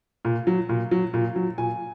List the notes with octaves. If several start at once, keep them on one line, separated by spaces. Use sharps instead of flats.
A#2
F#3
A#2
F#3
A#2
F#3
A#2 G#5